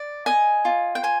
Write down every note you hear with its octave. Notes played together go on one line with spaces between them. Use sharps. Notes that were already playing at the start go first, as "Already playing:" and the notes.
Already playing: D5
D#5 G#5
F4
G5
C5 G#5